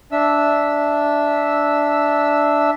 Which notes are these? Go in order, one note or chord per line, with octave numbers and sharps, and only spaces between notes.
D4 E5 E6